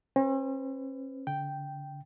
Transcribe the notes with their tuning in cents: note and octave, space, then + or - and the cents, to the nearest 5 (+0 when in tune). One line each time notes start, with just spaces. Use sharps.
C#4 -45 B4 +35
D3 -35 G5 -5